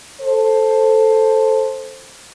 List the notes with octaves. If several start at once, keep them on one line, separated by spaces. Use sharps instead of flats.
A4 C5